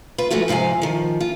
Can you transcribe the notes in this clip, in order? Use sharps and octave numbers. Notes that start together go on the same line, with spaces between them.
F4 B4
F3 G#3 A3 F4 F#4
G#2 C3 F3 F5 G#5
D#3 F3
F4